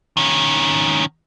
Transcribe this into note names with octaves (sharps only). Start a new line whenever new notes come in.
D#3 C#4